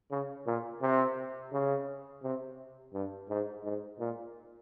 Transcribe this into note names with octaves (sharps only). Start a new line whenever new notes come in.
C#3
A#2
C3
C#3
C3
G2
G#2
G#2
A#2